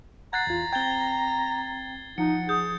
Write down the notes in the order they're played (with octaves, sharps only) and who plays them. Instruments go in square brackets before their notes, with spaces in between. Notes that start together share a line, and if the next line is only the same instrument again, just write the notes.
[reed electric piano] F#5 F#6 [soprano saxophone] A#5 [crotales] G#6 A6 C7
[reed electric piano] E2 F4
[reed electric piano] C4 G5 [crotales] G#6 A6 G7
[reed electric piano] F3 [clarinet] D#4 [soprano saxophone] F#5 [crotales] C#7
[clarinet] G#4 [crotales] G6